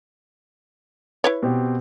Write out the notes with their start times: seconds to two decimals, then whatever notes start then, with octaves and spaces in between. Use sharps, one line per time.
1.24 E4 B4 C#5
1.43 B2 C4 G4